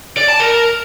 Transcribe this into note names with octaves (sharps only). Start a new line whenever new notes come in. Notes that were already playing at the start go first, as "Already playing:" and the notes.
D5
A5
A#4